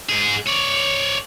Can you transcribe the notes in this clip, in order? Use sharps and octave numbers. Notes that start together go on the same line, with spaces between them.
G#2 G#4
C#5 D5